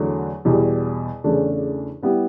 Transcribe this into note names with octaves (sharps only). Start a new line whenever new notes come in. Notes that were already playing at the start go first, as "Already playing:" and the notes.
Already playing: E2 D3 F#3 A3 D4
E2 B2 G3
E2 C#3 E3 A3 D4
G3 B3 E4 G4